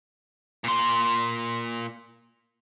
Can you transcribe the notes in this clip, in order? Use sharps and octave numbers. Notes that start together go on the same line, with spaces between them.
A#2 C6